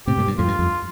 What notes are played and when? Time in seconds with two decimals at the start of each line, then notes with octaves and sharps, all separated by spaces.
0.07 A2 C3 G4
0.18 G2 A#2
0.28 G2
0.38 F2 A2 F4
0.48 G2
0.59 F2